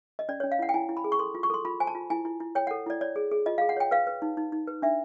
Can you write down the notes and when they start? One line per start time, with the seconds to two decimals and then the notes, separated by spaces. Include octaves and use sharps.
0.19 D#5
0.29 C#4 D5
0.40 C#5
0.44 C#4
0.52 F5
0.59 E4 F#5
0.69 G5
0.74 E4 G#5
0.89 E4
0.97 B5
1.04 G#4
1.12 C#6
1.19 A4 C6
1.35 F4
1.43 C#6
1.50 A4 C6
1.65 F4 B5
1.80 C5 G#5
1.87 A5
1.95 F4
2.10 E4 G#5
2.25 E4
2.40 E4
2.55 C#5 G5
2.67 F#5
2.71 A4
2.86 E4 D5
3.01 C#5 D5
3.16 G#4
3.31 G#4
3.46 F4 D#5
3.58 F5
3.62 G#4
3.69 F#5
3.77 C#5 G5
3.91 B4 F5
4.07 B4
4.22 D#4
4.37 D#4
4.52 D#4
4.67 B4
4.82 D4 E5